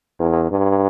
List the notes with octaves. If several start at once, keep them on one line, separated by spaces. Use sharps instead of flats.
E2
G2